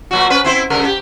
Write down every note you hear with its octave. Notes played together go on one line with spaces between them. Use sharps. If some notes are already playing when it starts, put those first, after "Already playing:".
A#2 F#3 F#4
C#4 B4
C4 E4 C5
G2 C#3 A#4
G4